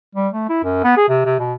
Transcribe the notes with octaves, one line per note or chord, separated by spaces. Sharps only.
G3
A3
E4
F#2
B3
G#4
C3
C3
B2